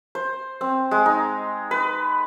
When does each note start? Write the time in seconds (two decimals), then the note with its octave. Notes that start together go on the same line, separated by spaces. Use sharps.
0.15 C5
0.61 C4
0.91 G#3
1.06 D#4
1.71 B4